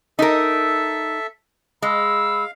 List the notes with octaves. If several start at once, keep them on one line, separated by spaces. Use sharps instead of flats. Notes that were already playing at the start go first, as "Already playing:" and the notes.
D#4 A4 A#4 E5
G#3 F5 B5 E6